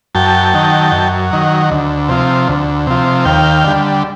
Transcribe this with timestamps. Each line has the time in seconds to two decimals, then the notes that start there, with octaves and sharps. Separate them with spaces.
0.15 F#2 G5 A5
0.53 D#3 F#3
0.92 F#2
1.31 D#3 F#3
1.71 D2
2.09 C3 F3
2.48 D2
2.87 C3 F3
3.25 D#2 F5 G5
3.65 D3 G3